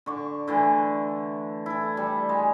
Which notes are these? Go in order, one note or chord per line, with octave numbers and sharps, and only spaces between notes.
D3 C#6 D6
D3 E3 A3
E4 A4
G3
G#3